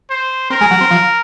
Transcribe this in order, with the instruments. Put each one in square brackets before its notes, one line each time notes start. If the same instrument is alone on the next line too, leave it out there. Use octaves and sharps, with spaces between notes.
[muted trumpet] C5
[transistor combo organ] C4 [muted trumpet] A#4
[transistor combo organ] G#3
F#3
C4
F3